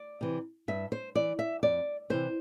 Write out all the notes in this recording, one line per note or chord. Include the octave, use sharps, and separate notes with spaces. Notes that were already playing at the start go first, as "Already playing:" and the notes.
Already playing: D5
C3 E3
G2 E5
C5
E3 D5
E5
F2 D5
C3 E3 C5